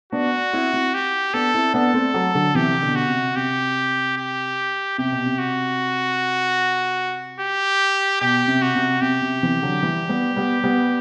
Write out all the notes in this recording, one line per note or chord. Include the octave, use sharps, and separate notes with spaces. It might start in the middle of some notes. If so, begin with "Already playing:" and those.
B3 D4 F#4
C4 E4
C4 E4
G4
B3 D4 A4
C4 E4
B3 D4 A4
A3 C4
F#3 A3
D3 F#3
C3 E3 G4
B2 D3
F#4
C3
C3 G4
G4
C3 G4
B2
C3
F#4
G4
B2 G4
C3
F#4
C3
C3 G4
C3
C3 E3
D3 F#3
E3 G3
G3 B3
G3 B3
G3 B3